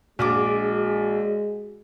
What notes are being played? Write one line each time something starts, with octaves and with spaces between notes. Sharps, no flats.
A#1 G#3 D4 F#4 G#4 D6